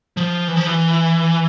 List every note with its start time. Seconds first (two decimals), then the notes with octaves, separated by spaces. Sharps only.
0.17 F3
0.48 E3
0.56 F3
0.67 E3